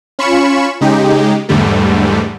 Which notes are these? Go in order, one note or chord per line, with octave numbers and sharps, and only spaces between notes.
C#4 F4 B5 C#6 C#7 E7
C#3 G#3 D#4 G4
E2 G#2 D3 G3 A3